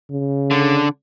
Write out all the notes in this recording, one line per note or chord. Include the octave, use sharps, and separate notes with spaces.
C#3
D3